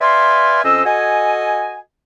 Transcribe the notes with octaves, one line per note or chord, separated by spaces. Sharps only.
B4 D5 E5 F5 G#5 C6
F2 C#4 C5 D#5 E6
F#4 A4 D#5 G#5